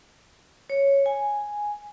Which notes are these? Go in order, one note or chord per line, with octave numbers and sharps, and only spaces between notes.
C#5
G#5